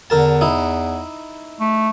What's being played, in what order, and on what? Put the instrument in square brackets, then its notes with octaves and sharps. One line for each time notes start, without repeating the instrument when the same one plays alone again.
[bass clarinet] E2 [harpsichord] D3 A#4 A5
[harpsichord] D#4 E4
[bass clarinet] A3